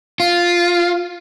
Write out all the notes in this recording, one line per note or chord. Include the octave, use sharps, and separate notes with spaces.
F4